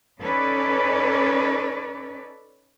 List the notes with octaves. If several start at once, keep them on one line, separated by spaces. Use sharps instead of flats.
C#4 D#4 A4 B4 D5